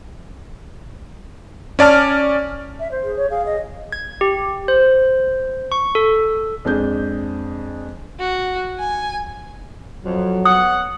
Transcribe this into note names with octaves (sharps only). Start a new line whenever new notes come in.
C#4 D5 A5 F6
E5
C5
G#4
C#5
G#4 F5
D#5
G#6
G4
C5
C#6
A4
F2 G#3 D4 G#4 G6
F#4
G#5
F2 F#3
B3 C#5 F#5 D#6